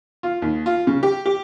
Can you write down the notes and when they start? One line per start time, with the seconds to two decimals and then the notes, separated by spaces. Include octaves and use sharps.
0.23 F4
0.42 D#2
0.66 F4
0.87 C#3
1.03 G4
1.26 G4